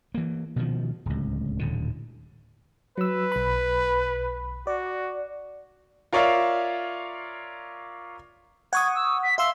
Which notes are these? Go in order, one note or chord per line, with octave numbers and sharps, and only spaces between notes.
E3 A#3
B2 D#3 F3
D1 C#2
D#1 A2 D3
F#3 B4 E6
B1 B5
F#4 D5
F4 A#4 C#5 D5 E5 F5
F#5 C#6 D#6 G#6
E6
B6
E5 F5 C6 E6